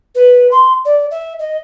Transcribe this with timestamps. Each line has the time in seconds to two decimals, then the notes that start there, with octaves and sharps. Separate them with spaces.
0.15 B4
0.51 C6
0.85 D5
1.11 E5
1.39 D#5